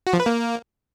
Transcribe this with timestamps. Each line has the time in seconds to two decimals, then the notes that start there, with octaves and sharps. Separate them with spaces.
0.07 F#4
0.13 F3
0.20 B4
0.26 A#3